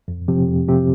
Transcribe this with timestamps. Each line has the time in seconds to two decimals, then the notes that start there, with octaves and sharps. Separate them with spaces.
0.08 F2
0.28 C3 F3 C4 G4
0.48 F2
0.68 C3 F3 C4 G4